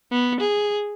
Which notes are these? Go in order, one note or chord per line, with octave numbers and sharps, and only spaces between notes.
B3
G#4